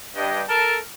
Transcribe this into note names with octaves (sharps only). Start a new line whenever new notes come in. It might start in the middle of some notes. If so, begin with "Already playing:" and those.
G2 G4 D#5
A4 A#4 A5